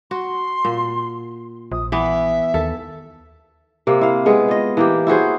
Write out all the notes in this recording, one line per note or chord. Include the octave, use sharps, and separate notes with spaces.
F#4 C6
A#2
A#1 D#6
E3 B3 E5
D#2 A4
C3 A#3
E4 F5
G#3 B3 G#4
F4 D#5
E3 A#3 G4
E4 F#4 G#4 C5